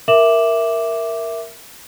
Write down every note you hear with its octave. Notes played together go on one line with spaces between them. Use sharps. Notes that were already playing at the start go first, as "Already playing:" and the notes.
A#4 E5 D6 E7 F#7